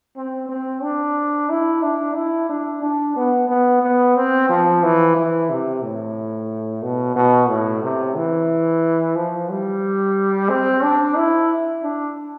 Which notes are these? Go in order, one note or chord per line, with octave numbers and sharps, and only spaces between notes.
C4
C4
D4
E4
D4
E4
D4
D4
B3
B3
B3
C4
F3
E3
E3
C3
A2
B2
B2
A2
C3
E3
F3
G3
C4
D4
E4
D4